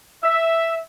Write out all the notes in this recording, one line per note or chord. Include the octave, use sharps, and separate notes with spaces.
E5